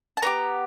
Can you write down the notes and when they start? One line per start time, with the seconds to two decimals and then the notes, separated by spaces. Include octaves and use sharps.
0.17 A5
0.22 B3 D4 G4 A#5